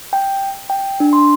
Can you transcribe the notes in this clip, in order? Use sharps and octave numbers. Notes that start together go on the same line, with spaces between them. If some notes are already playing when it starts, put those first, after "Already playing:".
G5
G5
D4
C6